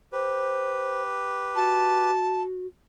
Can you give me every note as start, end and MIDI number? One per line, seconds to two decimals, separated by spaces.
0.12 2.11 67
0.12 2.11 71
0.12 1.02 72
1.56 2.67 66
1.56 2.42 81